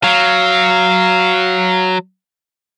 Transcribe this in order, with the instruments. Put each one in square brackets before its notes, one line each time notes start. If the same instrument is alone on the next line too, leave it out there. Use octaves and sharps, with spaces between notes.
[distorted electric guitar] F#3 [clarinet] F5